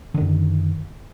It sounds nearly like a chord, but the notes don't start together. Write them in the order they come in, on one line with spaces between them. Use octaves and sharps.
D3 D#3 F#2